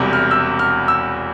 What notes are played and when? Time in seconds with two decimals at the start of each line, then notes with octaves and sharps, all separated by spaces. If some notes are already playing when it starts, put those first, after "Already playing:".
Already playing: E1 E2 C3 G3
0.13 F6
0.31 E6
0.59 F6
0.88 E6